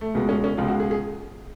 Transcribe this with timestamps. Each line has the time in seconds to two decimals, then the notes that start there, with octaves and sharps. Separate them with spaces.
0.01 A3
0.15 C#2 B2 G#3 B3
0.29 C#4
0.44 C#4
0.57 C#2 B2 G#3 F4
0.68 F#4
0.80 G#4
0.91 G#4